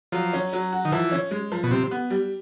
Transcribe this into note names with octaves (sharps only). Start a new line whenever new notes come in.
F3 F#3
C#4
F#3
F#4
D#3
E3 F3
C#4
G#3
F3
B2
C3 G3
B3
G3